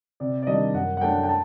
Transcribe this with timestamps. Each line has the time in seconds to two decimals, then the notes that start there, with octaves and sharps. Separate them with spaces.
0.20 C3 D5
0.42 D5
0.47 D#3 G3 D4 D#5
0.74 F#2 F#5
0.97 F#5
1.01 F#3 A3 D4 G5
1.23 G5
1.29 A5